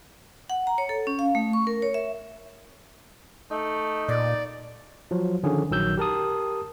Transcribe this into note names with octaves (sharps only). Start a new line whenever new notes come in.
F#5
A#5
C#5
A4
C#4
F5
A3
C#6
A#4
C#5
E5
A3 D#4
A#2 D5
F3 F#3
D3 D#3 F3 C#4 G#4
A#1 D#3 F#3 E6 G6
G4 A#4 A5 D#6